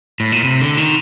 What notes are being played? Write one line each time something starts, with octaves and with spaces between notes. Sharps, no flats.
A2
A#2
C3
D3
D#3